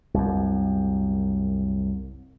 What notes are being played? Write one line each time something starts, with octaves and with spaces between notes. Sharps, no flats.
C2 F#2